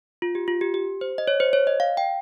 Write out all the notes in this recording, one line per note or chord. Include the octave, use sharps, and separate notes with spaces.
F4
G4
F4
G4
G4
C5
D#5
C#5
C5
C#5
D#5
F5
G5